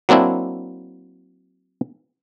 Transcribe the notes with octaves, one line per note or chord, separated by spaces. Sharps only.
F#3 A#3 C4 D4 E4